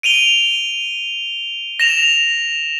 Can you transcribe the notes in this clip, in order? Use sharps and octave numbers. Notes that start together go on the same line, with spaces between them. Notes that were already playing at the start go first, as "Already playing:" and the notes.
D7 D#7 F7 G7
A#6 E7 F7